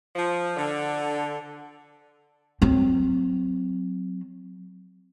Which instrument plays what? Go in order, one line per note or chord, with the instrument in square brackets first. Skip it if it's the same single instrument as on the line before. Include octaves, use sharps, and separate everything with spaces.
[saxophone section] F3
D3
[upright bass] F#3 C4